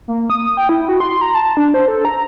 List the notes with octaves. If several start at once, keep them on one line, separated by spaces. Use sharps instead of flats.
A#3
D#6
G5
E4
F#4
C6
A#5
A5
D4
C5
A4
A#5